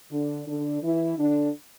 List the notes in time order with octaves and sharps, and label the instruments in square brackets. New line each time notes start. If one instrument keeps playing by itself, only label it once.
[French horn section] D3 D4
D3 D4
E3 E4
D3 D4